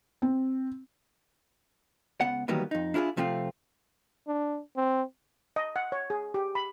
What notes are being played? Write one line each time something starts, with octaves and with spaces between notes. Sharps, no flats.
C4
C#2 B3 F#5
D#3 E3 F#3 G3 A#3 B3
F2 D#4
D4 E4 F4 G4 G#4
C3 F3 A3 C4 F4
D4
C4
D#5
F#5
C#5
G#4
G4
B5